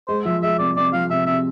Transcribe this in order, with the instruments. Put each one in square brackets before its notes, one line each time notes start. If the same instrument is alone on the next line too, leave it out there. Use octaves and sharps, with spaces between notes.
[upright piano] G#3 [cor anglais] C5
[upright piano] F3 [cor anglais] E5
[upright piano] G#3 [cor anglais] E5
[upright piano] C2 [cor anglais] D5
[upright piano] C2 [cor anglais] D5
[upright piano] F3 [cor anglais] F5
[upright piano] C3 [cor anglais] E5
[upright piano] C3 [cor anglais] E5